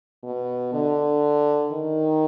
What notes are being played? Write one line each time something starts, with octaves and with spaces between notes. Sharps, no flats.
B2
D3
D#3